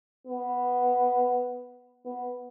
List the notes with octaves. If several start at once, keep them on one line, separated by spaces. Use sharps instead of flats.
B3
B3